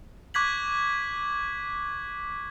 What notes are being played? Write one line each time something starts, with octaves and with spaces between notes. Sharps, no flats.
C#6 D6 F#6 G#6 B6 F#7